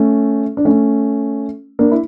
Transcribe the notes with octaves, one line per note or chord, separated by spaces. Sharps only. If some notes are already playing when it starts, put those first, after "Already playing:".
Already playing: A3 C#4
D4
A3 C#4
A#3 D4
E4